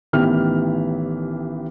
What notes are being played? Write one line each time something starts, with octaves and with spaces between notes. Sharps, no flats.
A1 D#3 E3 B3 G4 F6